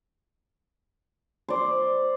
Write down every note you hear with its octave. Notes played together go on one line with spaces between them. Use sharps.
C5 D5